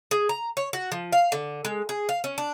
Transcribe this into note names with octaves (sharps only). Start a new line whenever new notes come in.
G#4
A#5
C#5
F#4
F3
F5
D3
G#3
G#4
F5
C#4
D4